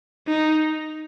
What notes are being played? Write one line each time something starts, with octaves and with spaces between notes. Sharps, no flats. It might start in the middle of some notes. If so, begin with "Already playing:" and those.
D#4